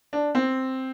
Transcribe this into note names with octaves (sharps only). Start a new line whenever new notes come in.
D4
C4